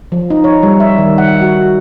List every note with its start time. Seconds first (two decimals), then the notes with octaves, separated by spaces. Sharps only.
0.12 F3
0.30 D#4
0.44 C#5
0.63 G3
0.80 E5
0.98 D#3
1.18 F#5
1.41 F#4